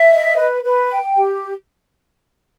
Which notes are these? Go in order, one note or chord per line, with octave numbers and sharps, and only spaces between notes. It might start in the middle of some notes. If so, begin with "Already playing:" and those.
Already playing: E5
D#5
B4
B4
G5
G4